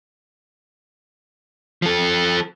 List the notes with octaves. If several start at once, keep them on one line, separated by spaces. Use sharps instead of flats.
F3 A4